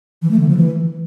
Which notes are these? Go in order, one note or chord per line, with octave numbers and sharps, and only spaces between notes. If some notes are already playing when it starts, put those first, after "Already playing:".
E3
A3
D3
F3
E3